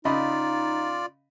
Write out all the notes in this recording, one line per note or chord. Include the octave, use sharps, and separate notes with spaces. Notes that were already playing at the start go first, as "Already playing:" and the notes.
C#3 D#4 F4 D5 D#5 B5